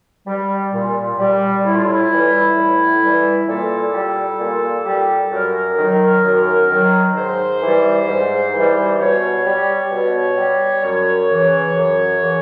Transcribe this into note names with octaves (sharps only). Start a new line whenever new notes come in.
G3
A#2
G3
A2 E4
F4
E4
E3 G3
A2
E3 G3
A#2 A4
G3
A#2
G3
F#2 A#4
D#3 F#3
F#2
D#3 F#3
G#2 C5
E3 G3
G#2
E3 G3
B2 C#5
G3
B2
G3
F#2 C#5
C#3 E3
F#2
C#3 E3